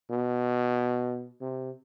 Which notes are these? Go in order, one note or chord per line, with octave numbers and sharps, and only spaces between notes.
B2
C3